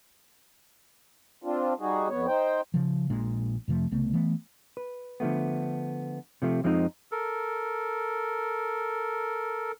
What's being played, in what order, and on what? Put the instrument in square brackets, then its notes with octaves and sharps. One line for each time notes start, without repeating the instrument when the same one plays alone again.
[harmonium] C4 D4 F4
G3 D#4 F#4 G#4
F2 B3 C#5
D#4 C5 G5
[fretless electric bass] C#3 F3
A#1 A#2 G#3 D4
F2 C3 F3 A3
C2 C#3 A3 B3
E3 A3 B3
[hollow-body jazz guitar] B4
D3 F3 A3 B3
C3 F3 A3
F2 F3 G#3 C4 D4 D#4
[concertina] A4 A#4